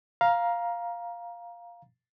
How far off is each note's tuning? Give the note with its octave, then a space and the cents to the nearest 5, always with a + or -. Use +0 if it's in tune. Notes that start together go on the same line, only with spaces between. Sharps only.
F5 +0 A#5 +15